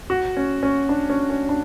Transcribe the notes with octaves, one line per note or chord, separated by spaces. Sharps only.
F#4
C#4
C#4
D4
C#4
C#4
D4